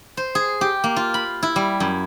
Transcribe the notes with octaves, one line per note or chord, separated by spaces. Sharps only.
C5
G#4
G4
A#3
F4
B5
E4
G3
F#2